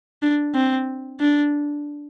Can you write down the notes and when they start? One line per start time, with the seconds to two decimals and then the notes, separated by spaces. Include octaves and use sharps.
0.22 D4
0.54 C4
1.21 D4